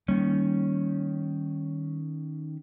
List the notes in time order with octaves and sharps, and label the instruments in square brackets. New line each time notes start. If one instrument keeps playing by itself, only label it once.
[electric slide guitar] D#3 C#4 [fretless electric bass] G3 A#3